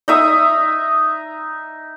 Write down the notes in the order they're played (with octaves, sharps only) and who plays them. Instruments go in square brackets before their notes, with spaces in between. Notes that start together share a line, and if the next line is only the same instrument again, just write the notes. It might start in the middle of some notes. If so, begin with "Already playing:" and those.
[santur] D#4 E5 D#6